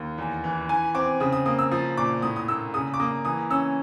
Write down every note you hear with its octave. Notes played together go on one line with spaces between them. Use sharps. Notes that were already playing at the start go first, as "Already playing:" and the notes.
Already playing: D#2
E2
E3
E3 G#5
C4 D6
C#3 D#6
D#6
A#3 D#6
E6
F3 D#6
A#2 D6
A2 D#6
D#6
A#3 E6
C#3 D#6
D6
A#3 D#6
E3 D#6
C#4 E6